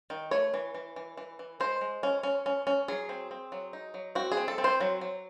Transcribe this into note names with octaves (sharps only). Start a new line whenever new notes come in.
D#3
A3 C#5
E3
E3
E3
E3
E3
G#3 C5
G#3
C#4
C#4
C#4
C#4
F#3 G#4
C4
C4
F#3
D#4
F#3
C4 F#4
G#4
C4
A4
C4
C5
F#3
F#3